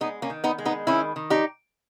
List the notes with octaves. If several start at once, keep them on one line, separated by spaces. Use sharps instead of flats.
G#3 B3 D#4
A#3 C#4
D#3
B3 D#4
G#3
B3 D#4
D#3 C#4 E4
D#3
D#4 G4